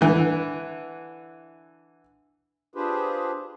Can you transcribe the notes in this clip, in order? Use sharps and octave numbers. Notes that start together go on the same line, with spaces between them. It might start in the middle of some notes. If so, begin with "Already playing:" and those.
D3 E3
D4 F4 G4 G#4 B4 C5